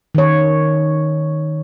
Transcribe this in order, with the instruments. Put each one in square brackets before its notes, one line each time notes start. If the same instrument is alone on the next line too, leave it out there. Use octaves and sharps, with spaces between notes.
[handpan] D#3 C#5